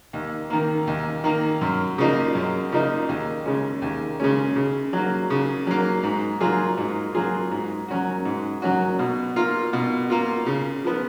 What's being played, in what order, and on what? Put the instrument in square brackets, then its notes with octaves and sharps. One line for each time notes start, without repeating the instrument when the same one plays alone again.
[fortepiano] D#2
D#3 A#3
D#2
D#3 A#3
F#2
C#3 F3 A#3 D#4
F#2
C#3 F3 A#3 D#4
D#2
C#3 G#3 C#4
D#2
C#3 G#3 C#4
C#3
F#3 A#3
C#3
F#3 A#3
G#2
F#3 A#3 F4 G#4
G#2
F#3 A#3 F4 G#4
G#2
F#3 C#4 F#4
G#2
F#3 C#4 F#4
B2
A#3 F4
B2
A#3 F4
C#3
F3 B3